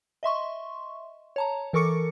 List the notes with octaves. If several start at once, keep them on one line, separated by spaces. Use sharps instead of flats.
D#5 E5 C6 C#6
C#5 A5 A#5
E3 A4 A#4 C#6 D6 C#7